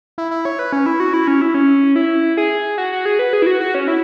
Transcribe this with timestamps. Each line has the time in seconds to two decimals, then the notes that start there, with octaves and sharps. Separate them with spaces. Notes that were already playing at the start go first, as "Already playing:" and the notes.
0.18 E4
0.31 E4
0.45 C#5
0.59 B4
0.72 C#4
0.86 E4
1.00 F#4
1.14 E4
1.28 C#4
1.41 E4
1.54 C#4
1.96 E4
2.37 G#4
2.78 F#4
2.92 F#4
3.05 G#4
3.19 B4
3.33 G#4
3.42 E4
3.46 F#4
3.60 F#4
3.75 C#4
3.88 E4